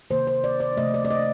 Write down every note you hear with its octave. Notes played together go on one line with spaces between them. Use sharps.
C3 D#3 A#3 C5
C5
D5
D5
C3 F3 A3 D#5
D5
D5
D#5